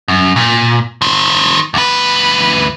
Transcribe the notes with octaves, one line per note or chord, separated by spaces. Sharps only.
F#2
A#2
D#3 C5
D2 B4